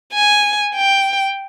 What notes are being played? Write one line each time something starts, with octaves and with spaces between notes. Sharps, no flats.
G#5
G5